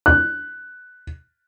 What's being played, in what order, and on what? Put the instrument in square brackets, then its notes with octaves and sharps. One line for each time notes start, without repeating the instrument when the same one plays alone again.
[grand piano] F#6